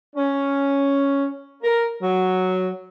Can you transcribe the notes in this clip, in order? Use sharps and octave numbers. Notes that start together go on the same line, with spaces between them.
C#4
A#4
F#3